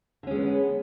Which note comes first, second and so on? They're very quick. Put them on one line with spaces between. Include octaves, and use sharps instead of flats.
D3 C#4 G#3 B3